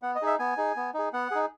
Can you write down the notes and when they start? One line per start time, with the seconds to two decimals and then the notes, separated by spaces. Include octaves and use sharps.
0.02 B3 F#5
0.15 D#5
0.22 D#4 G#4 E5
0.39 B3 G#5
0.57 D#4 G#4
0.76 B3
0.94 D#4 G#4
1.13 B3 F#5
1.31 D#4 G#4